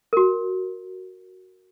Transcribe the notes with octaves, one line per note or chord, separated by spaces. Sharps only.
F#4 A#4